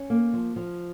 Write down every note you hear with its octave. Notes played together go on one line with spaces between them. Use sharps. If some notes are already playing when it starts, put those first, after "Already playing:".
Already playing: C#4
A#3
F3
F3